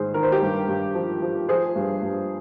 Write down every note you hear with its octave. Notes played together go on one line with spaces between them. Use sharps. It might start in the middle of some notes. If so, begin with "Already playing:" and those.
Already playing: G#2 D#3 G#4 C5
D#3 A#4
C5
G4 A#4
G2
G2
F3
F3
F3 G#4 C5
G2
G2